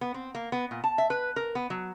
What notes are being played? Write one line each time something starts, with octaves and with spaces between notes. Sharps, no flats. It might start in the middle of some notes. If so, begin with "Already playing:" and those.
B3
C4
A#3
B3
A#2
A5
E5
B4
A#4
B3
F#3